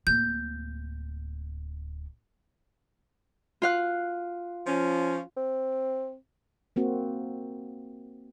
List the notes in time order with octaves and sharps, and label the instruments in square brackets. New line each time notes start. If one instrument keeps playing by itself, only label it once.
[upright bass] D1 A#3 [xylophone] G6
[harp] F4 F5 F#6
[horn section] F3 C#4
[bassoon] C4
[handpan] A#3 C4 F#4